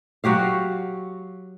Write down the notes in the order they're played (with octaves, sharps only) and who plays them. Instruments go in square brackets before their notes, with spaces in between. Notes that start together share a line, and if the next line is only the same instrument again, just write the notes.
[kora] F#3 F#4 G4 F5